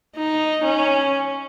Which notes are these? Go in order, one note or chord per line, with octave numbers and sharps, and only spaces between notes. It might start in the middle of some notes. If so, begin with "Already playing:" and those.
D#4
C#4